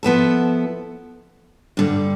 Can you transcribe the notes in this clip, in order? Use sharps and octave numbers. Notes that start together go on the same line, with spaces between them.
F3 B3 E4 A4
G2 D3 G3